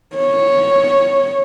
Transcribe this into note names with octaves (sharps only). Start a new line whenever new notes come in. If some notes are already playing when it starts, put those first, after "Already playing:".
C#5